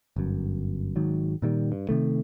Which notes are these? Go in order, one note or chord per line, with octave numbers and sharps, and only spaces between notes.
G1 F#2
G#1 G#2 D#3 F#3
A#2 D#3 G3
G2
C3 D#3 A3